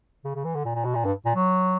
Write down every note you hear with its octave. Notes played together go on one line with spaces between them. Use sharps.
C#3
C#3
E3
D3
A#2
A#2
B2
A#2
G2
A#2
F#3